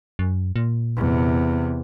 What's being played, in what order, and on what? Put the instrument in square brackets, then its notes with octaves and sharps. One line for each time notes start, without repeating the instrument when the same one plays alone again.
[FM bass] F#2
A#2
[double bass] E2 C3